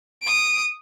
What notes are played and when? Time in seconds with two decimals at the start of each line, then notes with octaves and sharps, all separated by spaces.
0.23 D#6 D7